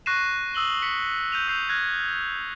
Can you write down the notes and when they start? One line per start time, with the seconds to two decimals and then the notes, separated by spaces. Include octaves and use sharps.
0.06 C#6 F#6 A#6 C7 D#7 E7
0.54 D#6 E6 F#7 G7
0.82 B6 C#7
1.32 G6 D#7 F7
1.48 E6 G6 C7 F7
1.69 F6 F#6 G#6 A#6